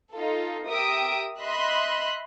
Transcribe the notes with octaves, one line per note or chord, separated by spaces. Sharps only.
D#4 F4 A4
G4 A#4 E5 D#6 D7
D#5 E5 B5 C6 F#6